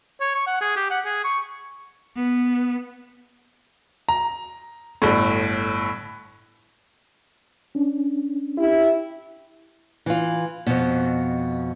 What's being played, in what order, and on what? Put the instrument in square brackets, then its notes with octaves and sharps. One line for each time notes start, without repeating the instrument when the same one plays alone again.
[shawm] C#5
C#6
F#5
G#4
G4
F#5
G#4
C#6
[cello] B3
[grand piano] A#5
G1 A2
[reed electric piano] C#4 D4
[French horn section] E4 G4
[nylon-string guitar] E3 F4
F2 B2